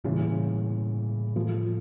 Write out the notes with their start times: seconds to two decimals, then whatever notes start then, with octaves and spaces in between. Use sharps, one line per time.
0.04 A2 C#3 E3 G3 A#3
1.36 F3 A3